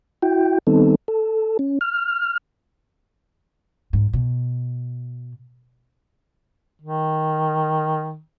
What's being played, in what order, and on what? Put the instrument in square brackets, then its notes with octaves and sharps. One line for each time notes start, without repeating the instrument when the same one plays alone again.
[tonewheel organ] E4 F#4 G5
D#3 G3 B3 C4 D#4 A4
A4
C#4
F6
[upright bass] G#2
B2
[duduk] D#3